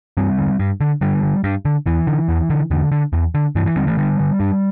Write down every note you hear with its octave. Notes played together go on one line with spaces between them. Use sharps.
G2 G3 C4
D3
G2
D3
G2 D3 G3
D3
G2
D3
E2 E3
D3
E2
D3
E2 D3
D3
E2
D3
G2 E3
E3
D3 G3 C4
E3 A3
G2 D3 G3
D3
G2